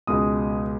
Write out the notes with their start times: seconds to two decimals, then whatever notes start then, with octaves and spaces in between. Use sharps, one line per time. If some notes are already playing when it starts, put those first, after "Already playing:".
0.07 C#2 B2 G#3 D#6